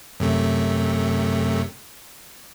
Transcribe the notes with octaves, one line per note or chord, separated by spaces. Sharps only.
F#2 C3 A3